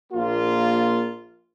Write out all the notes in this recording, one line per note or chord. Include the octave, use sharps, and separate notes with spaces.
A#1 A#3 F4